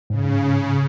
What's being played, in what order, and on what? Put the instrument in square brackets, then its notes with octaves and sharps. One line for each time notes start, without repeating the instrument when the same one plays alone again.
[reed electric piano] G#2 [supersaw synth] C#3